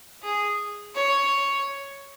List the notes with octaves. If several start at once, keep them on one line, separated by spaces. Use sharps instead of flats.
G#4
C#5